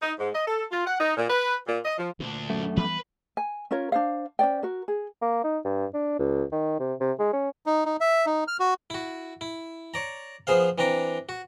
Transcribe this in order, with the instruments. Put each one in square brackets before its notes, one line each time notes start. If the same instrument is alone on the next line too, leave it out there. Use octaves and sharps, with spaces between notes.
[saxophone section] D#4
G#2
D#5
A4
F4
F#5
D#4
A#2
B4
A#2
D#5
F3
[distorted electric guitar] D2 D4 [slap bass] A#2
[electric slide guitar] F#2 A3
[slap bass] E3 G3 B3 [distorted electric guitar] B4
[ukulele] G#5
C#4 F4 A#4 C#5
D4 C5 F5
C#4 C5 D5 G5
F#4 A#4
G#4
[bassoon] A#3
D#4
G2
D4
C#2
D#3
C3
C3
G#3
C#4
[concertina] D#4
D#4
E5
D#4
F6
F#4
[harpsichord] E4 F#4
E4
C#5 D5 A#5
F3 B3 G#4 C5 F5
E3 C4 D4 A#5 D6
F#4